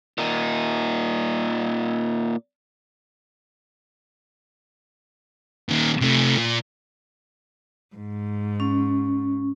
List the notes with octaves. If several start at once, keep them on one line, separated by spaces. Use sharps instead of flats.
A#2 D#4
A#2 D#3
C3 A3
A#2
G#2
C#4